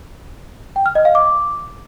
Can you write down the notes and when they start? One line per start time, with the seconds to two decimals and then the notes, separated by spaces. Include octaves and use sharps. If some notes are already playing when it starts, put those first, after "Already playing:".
0.76 G5
0.86 F6
0.95 D#5
1.05 F5
1.15 D6